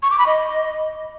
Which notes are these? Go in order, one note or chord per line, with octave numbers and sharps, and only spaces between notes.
C#6
D6
B5
D#5